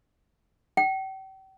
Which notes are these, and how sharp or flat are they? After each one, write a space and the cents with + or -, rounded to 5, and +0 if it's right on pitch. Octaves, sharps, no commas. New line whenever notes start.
G5 -40